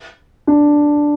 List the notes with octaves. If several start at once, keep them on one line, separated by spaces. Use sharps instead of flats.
D4